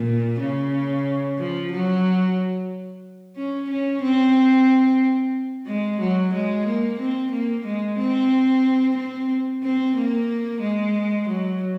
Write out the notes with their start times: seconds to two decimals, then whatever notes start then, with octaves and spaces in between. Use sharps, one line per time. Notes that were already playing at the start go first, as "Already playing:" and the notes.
Already playing: A#2
0.40 C#3
1.38 F3
1.72 F#3
3.36 C#4
3.70 C#4
4.02 C4
5.66 G#3
6.00 F#3
6.33 G#3
6.66 A#3
6.99 C4
7.31 A#3
7.65 G#3
7.98 C4
8.96 C4
9.63 C4
9.96 A#3
10.61 G#3
11.28 F#3